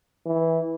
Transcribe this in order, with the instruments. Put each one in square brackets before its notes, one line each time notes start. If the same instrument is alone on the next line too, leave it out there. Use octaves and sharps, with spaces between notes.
[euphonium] E3